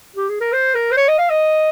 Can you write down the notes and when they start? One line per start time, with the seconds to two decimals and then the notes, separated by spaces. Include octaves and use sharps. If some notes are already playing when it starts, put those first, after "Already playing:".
0.16 G4
0.29 G#4
0.40 A#4
0.52 C5
0.74 A#4
0.91 C5
0.97 C#5
1.08 D#5
1.18 F5
1.30 D#5